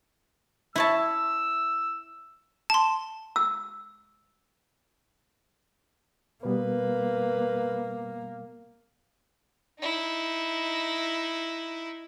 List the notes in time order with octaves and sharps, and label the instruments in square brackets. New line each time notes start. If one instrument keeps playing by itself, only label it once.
[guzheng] E4 C#5 A5 [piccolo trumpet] E6
[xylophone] A5 C6
[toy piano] E6
[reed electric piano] B2 G3 B3 [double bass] A#3 [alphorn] B4
[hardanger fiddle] D#4 E4